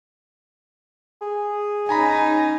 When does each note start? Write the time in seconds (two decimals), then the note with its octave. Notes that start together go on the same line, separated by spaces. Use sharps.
1.21 G#4
1.89 C#4 D#4 G#5 A#5 B5